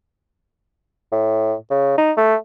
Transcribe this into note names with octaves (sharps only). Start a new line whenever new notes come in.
A2
C#3
D#4
A3